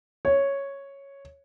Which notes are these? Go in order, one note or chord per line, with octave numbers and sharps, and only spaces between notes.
C#5